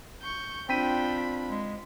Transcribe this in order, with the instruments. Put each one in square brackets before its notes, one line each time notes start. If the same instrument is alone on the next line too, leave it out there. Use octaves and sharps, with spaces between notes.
[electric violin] C#6 G6
[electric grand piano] C4 B6 D#7 [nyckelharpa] D4 F4 [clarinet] G5 [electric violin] B5
[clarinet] G#3